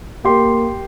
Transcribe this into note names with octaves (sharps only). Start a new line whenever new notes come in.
A#3 G4 C6